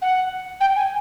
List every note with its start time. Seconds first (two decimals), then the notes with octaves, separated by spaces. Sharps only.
0.01 F#5
0.60 G5
0.75 G#5